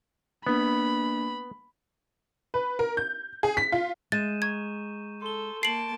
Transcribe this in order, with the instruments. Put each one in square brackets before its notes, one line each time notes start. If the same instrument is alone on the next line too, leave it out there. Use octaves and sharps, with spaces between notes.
[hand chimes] A#3 D4 [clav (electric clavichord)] B3 [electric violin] B5
[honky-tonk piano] B4
A#4
G6
G#4
B6
F4
[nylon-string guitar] G#3 [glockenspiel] G6 D#7 E7 [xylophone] A6
[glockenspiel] A#5 C#6 [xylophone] G#6
[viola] A4 [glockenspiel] C6 G7
[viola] A#3 A5 [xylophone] C7 F#7 [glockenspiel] D7